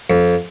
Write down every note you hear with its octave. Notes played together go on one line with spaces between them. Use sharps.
F2